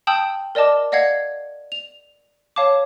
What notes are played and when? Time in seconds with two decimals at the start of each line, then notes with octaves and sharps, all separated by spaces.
0.07 G5 A5 D#6 E6 G6 F#7
0.55 A#4 D5 D#5 A5 D6
0.92 D5 D#5 F5 F#5 G#6 C7
1.72 F7
2.56 C#5 F5 A5 D6